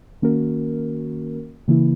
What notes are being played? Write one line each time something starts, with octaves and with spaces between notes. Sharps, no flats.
D#3 A#3 C#4 F#4 A#4
C#3 E3 A#3 E4